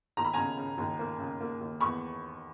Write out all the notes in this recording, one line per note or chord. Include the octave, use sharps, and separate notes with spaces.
D#2 A#5
B5
C#3 G#5 A#5
C#3
D#2
A#3
C#3
A#3
D#2
E2 B5 C#6